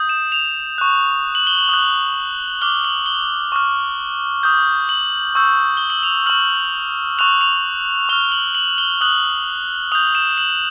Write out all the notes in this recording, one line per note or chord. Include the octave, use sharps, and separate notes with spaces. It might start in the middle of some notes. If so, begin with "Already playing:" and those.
Already playing: D#6 G6
E7
F7
C#6 F#6
F#7
G7
F#7
D#6 F#6
D6 F6 G7
F#7
G7
C#6 F6
D#6 G6
F#7
C#6 E6 G6
G7
F#7
F7
C#6 F6 F#7
C#6 F#6 F7
F7
C#6 F6 G7
F#7
F#7
G7
D#6 F#6 F#7
D#6 G6 F7
E7
F#7